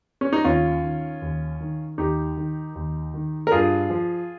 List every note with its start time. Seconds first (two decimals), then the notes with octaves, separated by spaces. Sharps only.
0.21 C#4
0.33 D#4
0.44 D#2 C#4 F4
0.83 D#3
1.22 D#2
1.61 D#3
1.98 D#2 D#4 G4
2.37 D#3
2.75 D#2
3.14 D#3
3.47 A#4
3.52 G2 F4 G#4
3.90 F3